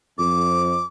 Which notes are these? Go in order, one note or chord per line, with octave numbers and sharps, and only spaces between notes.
F2 D6